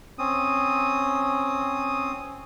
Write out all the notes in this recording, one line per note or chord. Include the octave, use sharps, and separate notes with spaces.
C4 C#4 D#6